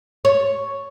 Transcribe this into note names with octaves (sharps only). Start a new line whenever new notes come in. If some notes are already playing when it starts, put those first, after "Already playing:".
C#5